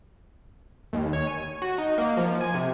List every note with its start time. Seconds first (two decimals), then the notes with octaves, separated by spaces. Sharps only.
0.93 D#2
1.13 C#5
1.27 G#5
1.41 D#7
1.62 F#4
1.78 D#4
1.98 A#3
2.17 F3
2.41 G#5
2.54 C3